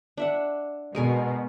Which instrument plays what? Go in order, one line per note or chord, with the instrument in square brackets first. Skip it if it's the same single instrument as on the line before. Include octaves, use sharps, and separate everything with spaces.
[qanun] D4 E5 F#5
[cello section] B2 [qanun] G#3 A#4 G#5